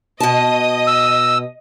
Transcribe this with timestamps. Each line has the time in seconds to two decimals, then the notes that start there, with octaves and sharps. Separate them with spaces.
0.20 B2 D#5 A5 D#6
0.87 E6